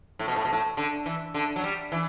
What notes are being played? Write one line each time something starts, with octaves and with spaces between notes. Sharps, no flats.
A2
B2
A2
B2
A2
D3
E3
D3
F#3
G3
E3